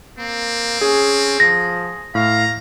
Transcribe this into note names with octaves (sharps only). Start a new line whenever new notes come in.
A#3 C4
C#4 G#4
F3 A#6
A2 F5 A#5